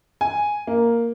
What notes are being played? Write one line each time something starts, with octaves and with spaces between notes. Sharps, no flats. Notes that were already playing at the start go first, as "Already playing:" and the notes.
G#5
A#3